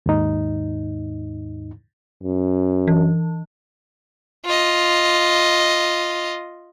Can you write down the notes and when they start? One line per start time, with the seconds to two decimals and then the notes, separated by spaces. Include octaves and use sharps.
0.06 D#2 G#2 D#4
2.23 F#2
2.88 E3
4.45 F4 D#5